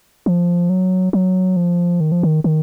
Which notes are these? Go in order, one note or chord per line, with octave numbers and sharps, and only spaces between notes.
F3
F#3
F#3
F3
D#3
F3
D#3
D#3